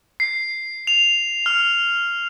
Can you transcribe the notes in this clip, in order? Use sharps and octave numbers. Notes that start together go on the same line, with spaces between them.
C7
F7
F6